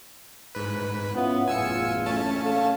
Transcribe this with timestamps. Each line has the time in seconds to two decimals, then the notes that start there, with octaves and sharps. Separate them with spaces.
0.55 G#2 B4
1.15 B3 C#4 E4 F4
1.48 F#1 E2 A2 F4 G#5 E6 C#7
2.06 A3 C#4 A5
2.41 A4 F5